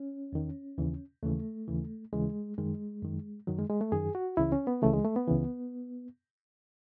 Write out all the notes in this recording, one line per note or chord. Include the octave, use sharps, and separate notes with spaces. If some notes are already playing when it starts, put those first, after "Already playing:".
Already playing: C#4
E2 D#3
D#2 C#3 E3
D#2 C#3 E3 A3
D#2 C#3 E3
D#2 C#3 E3 G#3
F#2 D#3 G#3
F#2 D#3
F#2 D#3 F#3
G#3
G#3
A3
F#2 D#3 G#4
F#4
C#2 C#3 E3 E4
C#4
B3
C#2 C#3 E3 A3
G#3
A3
B3
C#2 C#3 E3